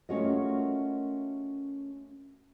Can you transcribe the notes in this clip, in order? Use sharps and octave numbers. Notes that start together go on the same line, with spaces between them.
A3 C#4 F4 F#4 A#4 D#5